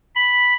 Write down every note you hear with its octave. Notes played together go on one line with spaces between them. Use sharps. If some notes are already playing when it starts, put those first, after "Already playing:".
B5